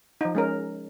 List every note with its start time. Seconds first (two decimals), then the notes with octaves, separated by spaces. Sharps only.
0.21 F3 D#4
0.35 G#3 C#4 A#4